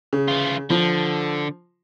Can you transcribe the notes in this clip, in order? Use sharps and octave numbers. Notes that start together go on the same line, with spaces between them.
C#3
E3 F4
D3 F3